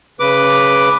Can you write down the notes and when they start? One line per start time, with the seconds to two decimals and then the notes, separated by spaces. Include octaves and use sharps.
0.20 C#3 B4 D6